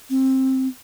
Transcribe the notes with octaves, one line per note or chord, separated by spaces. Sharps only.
C4